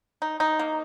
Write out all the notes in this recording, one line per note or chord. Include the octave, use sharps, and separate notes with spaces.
D#4
D#4
A#3